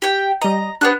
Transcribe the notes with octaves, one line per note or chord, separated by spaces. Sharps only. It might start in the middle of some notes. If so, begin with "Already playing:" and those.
G4 G5
G3 D#5 A#5
B3 D4 G4 C5 F#5 F#6